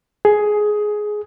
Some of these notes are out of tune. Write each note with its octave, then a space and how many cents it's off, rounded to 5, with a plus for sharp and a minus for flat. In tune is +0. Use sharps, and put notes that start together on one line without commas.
G#4 +10